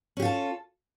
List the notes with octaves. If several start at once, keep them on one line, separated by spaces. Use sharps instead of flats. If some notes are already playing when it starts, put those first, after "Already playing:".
C#4 F4 G4 A4